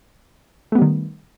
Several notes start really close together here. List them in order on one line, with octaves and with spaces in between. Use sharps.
A3 B3 G3 D#3